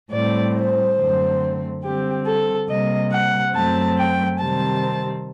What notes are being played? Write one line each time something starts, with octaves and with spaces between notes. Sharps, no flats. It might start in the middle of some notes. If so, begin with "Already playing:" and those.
A2 G3 C4 D5
C5
F#2 D3 A3 C4
D3 G3 C4 G4
A4
C3 G3 A#3 D#5
F#5
F#2 F#3 A3 C4 A5
G5
C3 D#3 G3 C4 A5